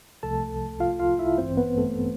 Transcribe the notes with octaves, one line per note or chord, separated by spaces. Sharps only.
C2 C3 F3 A3 A4 A5
F4 F5
F4 F5
E4 E5
A1 G2 E3 C4 C5
B3 B4
A3 A4